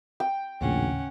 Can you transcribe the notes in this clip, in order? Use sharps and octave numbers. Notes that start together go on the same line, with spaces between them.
G5
A#1 D#2 A2 C#3 C#4 F#5